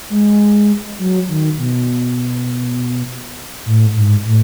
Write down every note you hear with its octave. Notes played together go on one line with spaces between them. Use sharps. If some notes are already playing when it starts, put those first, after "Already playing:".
G#3
F#3
D#3
B2
A2
G#2
A2